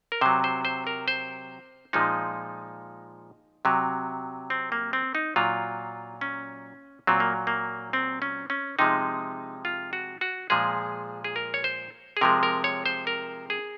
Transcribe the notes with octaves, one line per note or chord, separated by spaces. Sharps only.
A#4
C3 F#3 C5
C5
C5
A#4
C5
A#2 F3 G#3 D#4
C3 F#3
C4
A#3
C4
D#4
A#2 F#3 F4
C#4
A#2 F#3 C4
A#3
A#3
C4
C#4
C#4
C3 F3 G#3 D#4
F4
F#4
F#4
A#2 F3 G#3 G#4
G#4
A#4
C#5
C5
G#4
C3 F3 G#3 A#4
A#4
C#5
C5
A#4
G#4